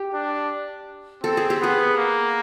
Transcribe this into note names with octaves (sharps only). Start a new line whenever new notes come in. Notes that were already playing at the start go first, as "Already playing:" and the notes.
Already playing: G4
D4
C4 A4
G#4
G4
B3 G#4
A#3